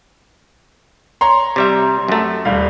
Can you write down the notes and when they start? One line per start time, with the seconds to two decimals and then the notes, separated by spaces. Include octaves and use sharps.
1.21 C#5 A#5 C6
1.56 C3 G3 E5
2.08 F#2 A3
2.45 D#1 G3 F5